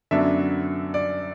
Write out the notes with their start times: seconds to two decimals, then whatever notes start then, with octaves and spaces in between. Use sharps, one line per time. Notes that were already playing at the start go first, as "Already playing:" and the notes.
0.11 F#2 D3 F#3 B3 D4 E5
0.94 D5